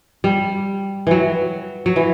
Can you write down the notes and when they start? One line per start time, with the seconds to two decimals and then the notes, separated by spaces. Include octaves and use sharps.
0.24 G3
1.07 E3 F#3
1.86 F#3
1.96 E3